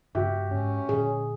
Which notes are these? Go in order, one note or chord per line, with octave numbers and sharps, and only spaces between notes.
G2 C#3 A#3 F#4 G4 E5
G#2 C#4
A#2 D3 G#4